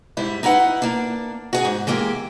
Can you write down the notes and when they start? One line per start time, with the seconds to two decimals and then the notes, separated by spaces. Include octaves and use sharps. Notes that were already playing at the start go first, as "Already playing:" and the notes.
0.17 G#2 G3 E4
0.43 D#4 E4 B4 F#5
0.82 A#3 D4
1.53 F#4 G#4
1.65 G#2
1.87 E3 G#3 A#3 G4